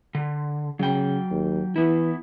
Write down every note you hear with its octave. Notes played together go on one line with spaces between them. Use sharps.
D3
C#3 F#3 G5
D#2
E3 B3 E4